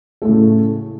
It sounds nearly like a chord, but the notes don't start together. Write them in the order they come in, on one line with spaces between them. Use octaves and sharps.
A3 A2 C#3